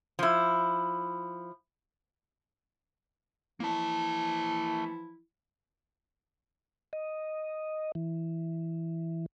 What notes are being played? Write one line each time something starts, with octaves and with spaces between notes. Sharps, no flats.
F3 E4
E3 F3 A#3 E4 A5
D#5
E3